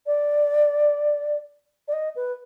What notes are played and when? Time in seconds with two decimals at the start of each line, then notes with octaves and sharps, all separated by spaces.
0.07 D5
1.88 D5
1.93 D#5
2.16 B4